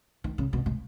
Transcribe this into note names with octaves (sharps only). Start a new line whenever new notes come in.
D#3
C#3
B2
B2